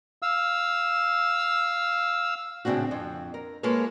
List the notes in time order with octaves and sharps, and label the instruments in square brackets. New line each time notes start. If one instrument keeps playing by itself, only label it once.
[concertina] F5 E6
[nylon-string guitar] A2 C#3 C4 D4 F#4
F2
A#4
G#3 A#3 F4 A4 B4 C#5